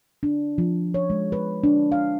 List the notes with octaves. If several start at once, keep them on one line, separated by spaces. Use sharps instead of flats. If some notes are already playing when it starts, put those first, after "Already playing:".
D4
F3
C#5
G#3
B4
D4
F5